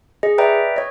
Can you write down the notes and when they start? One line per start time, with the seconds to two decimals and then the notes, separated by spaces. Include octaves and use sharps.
0.23 G#4 D#5
0.38 B4 D5 E5 G5 A#5
0.76 C#5 D#5